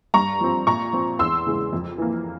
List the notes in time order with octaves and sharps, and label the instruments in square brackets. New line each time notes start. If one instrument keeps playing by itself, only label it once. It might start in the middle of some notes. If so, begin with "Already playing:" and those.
[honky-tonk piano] G2 A#5 C#6
F3 C4
A#2 A#5 C#6
F3 C4
E2 C6 E6
C#3 E3 G#3
F2
E3 A#3